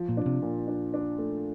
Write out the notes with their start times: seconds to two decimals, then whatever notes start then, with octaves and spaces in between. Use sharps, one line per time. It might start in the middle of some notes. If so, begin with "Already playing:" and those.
Already playing: F3
0.09 A#2
0.17 D4
0.26 C3
0.42 A#2
0.68 D4
0.94 D4
1.19 A3